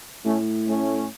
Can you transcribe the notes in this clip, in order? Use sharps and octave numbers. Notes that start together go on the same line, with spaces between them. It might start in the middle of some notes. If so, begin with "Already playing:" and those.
A2 A3 C#4
A3 C#4